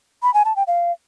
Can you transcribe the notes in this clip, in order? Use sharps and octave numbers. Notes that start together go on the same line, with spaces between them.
B5
G#5
A5
G5
F5